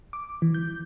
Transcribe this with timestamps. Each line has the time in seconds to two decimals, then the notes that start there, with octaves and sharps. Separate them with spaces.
0.13 D6
0.42 E3
0.54 G6